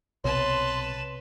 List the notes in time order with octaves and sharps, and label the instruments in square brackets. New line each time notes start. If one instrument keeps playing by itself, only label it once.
[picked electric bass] B1 C3 [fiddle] B4 A5 [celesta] C#5 [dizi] C6